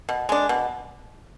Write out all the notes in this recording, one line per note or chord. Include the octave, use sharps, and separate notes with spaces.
B2
G#3 D4
B2